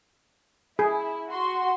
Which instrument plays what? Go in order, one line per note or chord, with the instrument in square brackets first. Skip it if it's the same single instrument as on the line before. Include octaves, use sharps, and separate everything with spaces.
[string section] E4 [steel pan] G#4
[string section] F#4 C6